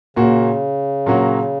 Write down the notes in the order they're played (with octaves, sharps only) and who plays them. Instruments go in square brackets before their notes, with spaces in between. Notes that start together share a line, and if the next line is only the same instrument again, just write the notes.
[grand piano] A#2 A#3 F#4 [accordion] C#3
[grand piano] A#2 F#3 A#3 C#4 F#4